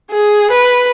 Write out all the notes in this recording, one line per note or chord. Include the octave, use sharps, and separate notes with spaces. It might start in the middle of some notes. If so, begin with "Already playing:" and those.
G#4
B4